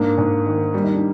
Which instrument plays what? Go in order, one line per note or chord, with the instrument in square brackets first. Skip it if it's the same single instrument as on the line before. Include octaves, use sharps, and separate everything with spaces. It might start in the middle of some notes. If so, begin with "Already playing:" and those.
Already playing: [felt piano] G#2 [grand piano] A#3 D4
[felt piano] G#2
D#3
G3
[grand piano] D#4
D4